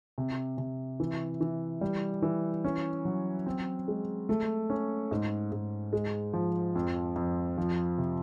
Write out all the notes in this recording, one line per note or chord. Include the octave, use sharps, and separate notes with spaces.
C3
C3
E3
E3
G3
E3
C#4
F#3
C4
G#3
A3
C#4
G#2
G#2
G#3
F3
F2
F2
F3
C3